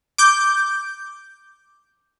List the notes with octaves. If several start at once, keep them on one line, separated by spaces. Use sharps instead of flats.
D6 G6